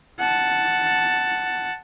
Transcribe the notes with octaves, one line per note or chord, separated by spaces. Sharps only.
F#5 A5